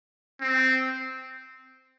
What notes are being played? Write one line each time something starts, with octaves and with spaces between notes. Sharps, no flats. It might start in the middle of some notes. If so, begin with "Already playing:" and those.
C4